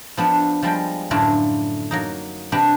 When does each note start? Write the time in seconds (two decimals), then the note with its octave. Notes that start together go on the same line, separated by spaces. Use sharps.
0.17 F3 B3 D4
0.63 F3 G3 G#3 G5
1.11 F#2 A2 D3 A3 D4 F4
1.91 F#3 A#3 D#4
2.52 C3 D4 G4 B4 A#5 B5